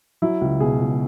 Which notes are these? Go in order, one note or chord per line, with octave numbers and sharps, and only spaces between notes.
F#3 E4
C#2
B2 G#4
C#2